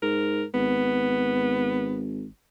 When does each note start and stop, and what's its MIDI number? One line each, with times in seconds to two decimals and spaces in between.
0.03 0.44 44
0.03 0.45 70
0.54 2.26 32
0.54 2.08 59